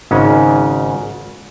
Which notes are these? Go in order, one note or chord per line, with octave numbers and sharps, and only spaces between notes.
G#1 G#2 C#3 G#3 C#4